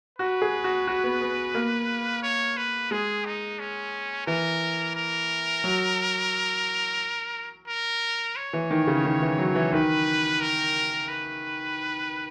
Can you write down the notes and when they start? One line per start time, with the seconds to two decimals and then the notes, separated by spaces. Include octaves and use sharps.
0.19 F#4 B4
0.42 G#4
0.64 F#4
0.87 F#4
1.04 B3
1.22 B3
1.55 A#3
2.23 C#5
2.57 B4
2.91 G#3 G#4
3.26 D#4
3.59 C#4
4.27 E3 A#4
4.96 A#4
5.64 F#3
7.68 A#4
8.37 C#5
8.53 E3
8.71 D#3
8.87 C#3
9.05 D#3
9.22 E3
9.38 F#3
9.55 E3
9.73 D#3 B4
10.41 A#4
11.09 B4